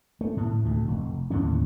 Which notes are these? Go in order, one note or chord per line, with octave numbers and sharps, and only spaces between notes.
A3
A2
D2 A2
F1
D#2 A2 D3 C#4